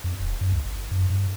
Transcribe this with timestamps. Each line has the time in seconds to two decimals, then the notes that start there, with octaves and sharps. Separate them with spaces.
0.04 F2
0.20 D#1
0.41 F#2
0.52 C#2
0.66 G1
0.91 F#2
1.10 G2